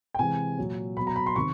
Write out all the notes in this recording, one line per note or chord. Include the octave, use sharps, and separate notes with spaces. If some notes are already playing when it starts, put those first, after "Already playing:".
G5
C3 E3 G#3 G#5
A#2 F#3
B2 F#3 B5
A#5
B5
C6
C3 D#3 C#6